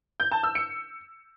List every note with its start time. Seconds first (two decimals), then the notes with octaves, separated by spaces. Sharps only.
0.20 G6
0.31 A5
0.43 E6
0.55 C#7